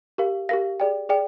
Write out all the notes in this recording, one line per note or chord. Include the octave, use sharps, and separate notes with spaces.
G4 A#4 F5
G4 A#4 F5 A#6
G#4 D5 G5
G#4 D5 G5